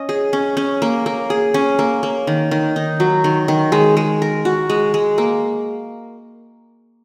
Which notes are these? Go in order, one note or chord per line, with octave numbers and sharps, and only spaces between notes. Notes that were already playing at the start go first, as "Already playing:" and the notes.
Already playing: C#4 D#5
G#4
C#4
C#4
A#3
A#3
G#4
C#4
A#3
A#3
D#3
D#3
D#4
F#3
D#3
D#3
G#3
G#3
A#4
F#4
G#3
G#3
A#3